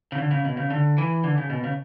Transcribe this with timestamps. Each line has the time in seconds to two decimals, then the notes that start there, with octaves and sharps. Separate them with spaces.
0.12 C#3
0.18 D3
0.31 C#3
0.45 B2
0.57 C#3
0.70 D3
0.98 E3
1.24 D3
1.38 C#3
1.50 B2
1.64 C#3